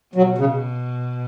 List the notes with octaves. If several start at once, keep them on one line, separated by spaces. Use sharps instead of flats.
B2 F#3
C#3